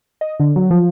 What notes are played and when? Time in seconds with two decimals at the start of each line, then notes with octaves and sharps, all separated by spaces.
0.21 D#5
0.40 D3
0.56 F#3
0.71 F3